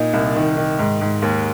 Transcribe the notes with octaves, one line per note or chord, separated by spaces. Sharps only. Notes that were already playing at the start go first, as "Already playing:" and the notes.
Already playing: A#2 D#4
C2
D#3
D#3
G#2
G#2
D#2